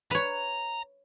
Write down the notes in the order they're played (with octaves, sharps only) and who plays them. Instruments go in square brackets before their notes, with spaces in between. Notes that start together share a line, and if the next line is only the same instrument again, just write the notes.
[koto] B4 C#5 [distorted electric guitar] A#5